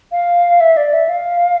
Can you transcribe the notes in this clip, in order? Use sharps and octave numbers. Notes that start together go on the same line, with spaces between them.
F5
E5
D5
E5
F5